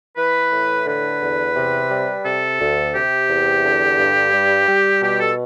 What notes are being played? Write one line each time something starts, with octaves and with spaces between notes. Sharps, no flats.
E3 B4
A2
D3 B4
E2
C3
G3
C3 A4
D2
C3 G4
E2
D3
G2
G3
G3
B2 G4
A4